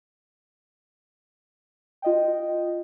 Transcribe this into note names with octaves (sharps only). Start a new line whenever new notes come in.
F4 D#5 G5